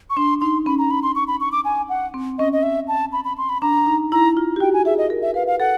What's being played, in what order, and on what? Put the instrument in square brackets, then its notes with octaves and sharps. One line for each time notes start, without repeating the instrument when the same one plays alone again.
[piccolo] C#6
[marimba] D4 [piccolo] C6
[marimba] D#4 [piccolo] C6
[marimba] C#4 [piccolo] B5
[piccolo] A#5
B5
C6
C#6
B5
C#6
D6
G#5
F#5
[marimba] C4
[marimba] C#4 [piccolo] D#5
[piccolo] D#5
E5
A5
B5
B5
C6
B5
[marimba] D4 [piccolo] A#5
[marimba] D#4
[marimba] E4 [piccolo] A#5
[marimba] F4
G4
[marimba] F#4 [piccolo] G5
[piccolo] G#5
[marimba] G#4 [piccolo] E5
[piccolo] D#5
[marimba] A#4
[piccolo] E5
[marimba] B4 [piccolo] F5
[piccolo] F5
[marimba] A4 [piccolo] F#5